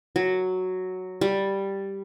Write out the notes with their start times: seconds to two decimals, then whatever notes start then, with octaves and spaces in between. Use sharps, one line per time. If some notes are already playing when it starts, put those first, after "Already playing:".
0.16 F#3
1.21 G3